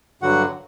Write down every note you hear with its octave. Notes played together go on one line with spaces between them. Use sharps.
G2 D3 F#3 F#4 F#5